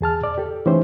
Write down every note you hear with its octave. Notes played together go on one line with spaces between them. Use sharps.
E2 G#4 A5 F6
D5
G4 A4
E3 A3 C#4 D#4 G4 C5